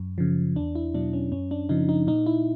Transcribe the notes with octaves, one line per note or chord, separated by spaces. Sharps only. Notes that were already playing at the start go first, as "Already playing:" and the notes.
Already playing: F#2
C#3 F3
E2 D4
E4
B2 F#3 D4
C#4
F#2 C#4
D4
C#3 F3 D#4
D#4
A#2 D#4
E4